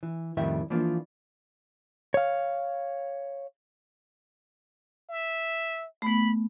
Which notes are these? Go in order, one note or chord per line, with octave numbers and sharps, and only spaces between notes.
E3
F2 A2 D#3 G3 E4 E5
E3 F3 A#3 D4 F4
C#5 F5
E5
A3 B3 B5